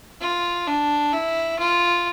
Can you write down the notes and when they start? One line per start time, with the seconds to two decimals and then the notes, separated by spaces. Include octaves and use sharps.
0.21 F4
0.67 D4
1.13 E4
1.59 F4